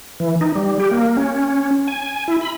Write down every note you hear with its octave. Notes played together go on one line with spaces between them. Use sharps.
E3
D#4
G3
G4
A#3
C#4
G#5
E4
B5